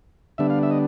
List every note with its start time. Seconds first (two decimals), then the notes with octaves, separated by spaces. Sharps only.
0.38 D3 G3 B3 D4 E5
0.50 F5
0.63 E5
0.71 D#5